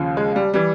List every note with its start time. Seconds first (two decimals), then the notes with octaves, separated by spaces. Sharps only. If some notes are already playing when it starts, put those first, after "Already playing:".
Already playing: D#2 C#3 F3
0.17 G#3
0.36 G3
0.54 E3 G3